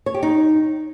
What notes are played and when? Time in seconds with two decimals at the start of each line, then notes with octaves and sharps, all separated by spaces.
0.06 C#5
0.14 G4
0.23 D#4